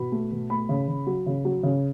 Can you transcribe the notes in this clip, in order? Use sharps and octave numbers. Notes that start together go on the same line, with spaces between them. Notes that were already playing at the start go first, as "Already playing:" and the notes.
Already playing: B2 B5
A3
B2
A3 B5
C#3
C#3
F#3
C#3
F#3
C#3